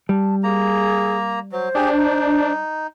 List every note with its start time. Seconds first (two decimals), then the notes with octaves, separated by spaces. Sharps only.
0.09 G3 A5
0.44 A#3 G#4 A#5
1.52 F#3 C5
1.75 D4 G4 G#4
1.98 D#4